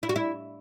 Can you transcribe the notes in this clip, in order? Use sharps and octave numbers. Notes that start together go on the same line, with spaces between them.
E4
F#4
E4